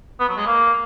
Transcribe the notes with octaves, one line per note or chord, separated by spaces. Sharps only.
B3
F#3
G#3
A#3